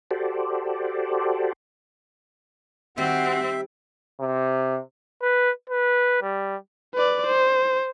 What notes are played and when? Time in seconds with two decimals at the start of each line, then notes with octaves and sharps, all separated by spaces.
0.11 F#4 G4 A4 C5 D5
2.98 D#3 G3 C4 F#4 G4 E5
4.20 C3
5.22 B4
5.70 B4
6.22 G3
6.95 B4 D5
7.26 C5